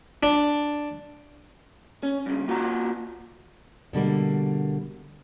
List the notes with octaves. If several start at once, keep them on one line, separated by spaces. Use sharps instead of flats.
D4
C#4
G2 C#3
A#3 F4 F#4 F#5 A#5
B2 D3 G3 A#3